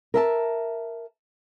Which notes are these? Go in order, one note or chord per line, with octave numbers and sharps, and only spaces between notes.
A#4 E5 A5